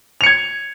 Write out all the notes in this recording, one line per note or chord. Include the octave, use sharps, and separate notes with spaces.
G#6 C#7 F7